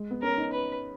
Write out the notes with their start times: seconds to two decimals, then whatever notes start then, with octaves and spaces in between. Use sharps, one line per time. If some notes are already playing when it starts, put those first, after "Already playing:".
Already playing: G#3
0.11 B3
0.23 C#4 A#4
0.38 D#4
0.53 B4